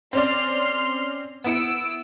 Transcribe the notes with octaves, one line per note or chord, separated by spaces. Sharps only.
C4 C#4 D5 C6 F6
B3 E4 E6 C#7 D7